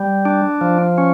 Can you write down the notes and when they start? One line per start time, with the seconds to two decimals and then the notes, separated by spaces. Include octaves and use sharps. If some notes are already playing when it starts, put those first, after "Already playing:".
Already playing: G3
0.25 D4
0.61 F3
0.98 C#4